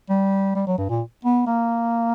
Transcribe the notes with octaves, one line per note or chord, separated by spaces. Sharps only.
G3
G3
F#3
G2
A#2
B3
A#3